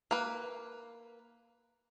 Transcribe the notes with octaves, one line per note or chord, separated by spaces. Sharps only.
A#3 B4